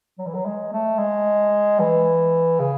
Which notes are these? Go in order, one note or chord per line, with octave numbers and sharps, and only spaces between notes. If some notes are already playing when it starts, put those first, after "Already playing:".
F#3
E3
F#3
G#3
A3
G#3
E3
C#3